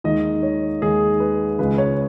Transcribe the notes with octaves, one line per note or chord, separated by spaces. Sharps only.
D#2 D#3 G#3 D#5
C#5
D#2 D#3 G#3 G#4
B4
C#2 C#3 G#3 B4
C#5